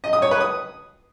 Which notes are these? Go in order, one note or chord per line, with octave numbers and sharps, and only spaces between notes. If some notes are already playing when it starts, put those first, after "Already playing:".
D#5
D#6
C#5
B4
D#6